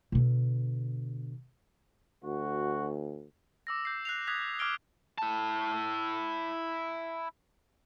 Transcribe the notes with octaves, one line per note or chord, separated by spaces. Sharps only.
B2 D3
D2 F#4
D6 E6 A#6
G6 C7
F#6 C7 F7
D#6 F#6 G#6 B6 F7
D6 F6 G#6 D7 G7
E4 A5